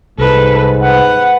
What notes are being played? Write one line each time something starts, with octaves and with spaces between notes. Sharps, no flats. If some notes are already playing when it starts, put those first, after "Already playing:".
C2 G#2 A4 B4
B4 F#5